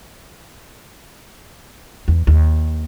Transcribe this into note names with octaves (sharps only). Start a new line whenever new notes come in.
E2
D#2